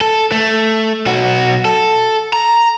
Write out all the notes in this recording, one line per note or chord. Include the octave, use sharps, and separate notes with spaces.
A4
A3
B1 F#4
A4
A#5